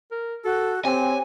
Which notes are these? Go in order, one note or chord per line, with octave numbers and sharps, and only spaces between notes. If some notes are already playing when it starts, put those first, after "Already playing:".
A#4
F#4 A4
C4 G4 C#5 G#5